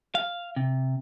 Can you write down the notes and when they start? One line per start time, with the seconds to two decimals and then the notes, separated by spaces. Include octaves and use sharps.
0.15 F5
0.56 C3